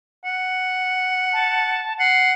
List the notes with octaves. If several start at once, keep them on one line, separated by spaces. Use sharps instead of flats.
F#5
A5
F#5 C7